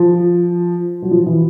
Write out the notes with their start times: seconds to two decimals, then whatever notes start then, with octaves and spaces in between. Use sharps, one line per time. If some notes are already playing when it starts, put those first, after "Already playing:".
Already playing: F3
1.02 F#3
1.11 F3
1.26 E3